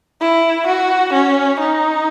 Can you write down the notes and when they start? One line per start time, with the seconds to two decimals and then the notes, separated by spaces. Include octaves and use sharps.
0.21 E4
0.67 F#4
1.13 C#4
1.60 D#4